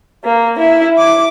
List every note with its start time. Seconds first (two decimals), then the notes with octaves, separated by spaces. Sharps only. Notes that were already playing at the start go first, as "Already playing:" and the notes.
0.22 A#3
0.57 E4
0.97 D6